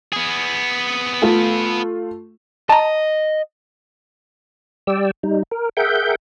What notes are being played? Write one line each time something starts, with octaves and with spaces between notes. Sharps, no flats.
B3 G#4
A3 F4 A4
D#5 A5 A#5
G3 D5 G5 E6
G3 D#4
A#4
G#4 A#4 E5 F#5 G5 G6